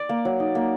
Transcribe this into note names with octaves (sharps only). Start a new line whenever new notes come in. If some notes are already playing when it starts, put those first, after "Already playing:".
Already playing: D5
A#3
F#3
D#4
A#3